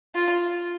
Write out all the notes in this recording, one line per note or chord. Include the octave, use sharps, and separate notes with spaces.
F4